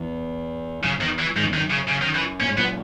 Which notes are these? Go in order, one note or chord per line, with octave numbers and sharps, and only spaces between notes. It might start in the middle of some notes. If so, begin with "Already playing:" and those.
Already playing: E2
F#2 C#3
E2 D#3
E3
G#2 D#3
F#2
E2 D#3
F#2
C#3
C#3
D#3
E3
A#2 C#4
G#2
F#2 A#2 B3